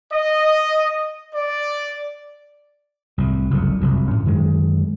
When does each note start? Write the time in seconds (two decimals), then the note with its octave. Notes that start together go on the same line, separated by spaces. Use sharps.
0.12 D#5
1.35 D5
3.18 C2 A2
3.50 F#1 C2 F2 A#2
3.81 F1 C2 F#2
4.08 A2 C#4
4.25 F#2 D#3 G#3